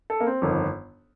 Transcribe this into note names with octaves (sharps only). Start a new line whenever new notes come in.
A4
A#3
C4
G1 F2 D#3